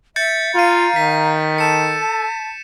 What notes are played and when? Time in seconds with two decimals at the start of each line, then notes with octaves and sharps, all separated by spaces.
0.16 E5 G6 A6 C#7
0.55 F4 F5 A#5 A6 D#7
0.96 D#3 B6
1.58 A4 A5 C#7 E7